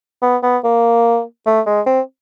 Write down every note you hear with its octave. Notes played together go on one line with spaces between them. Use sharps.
B3
B3
A#3
A3
G#3
C4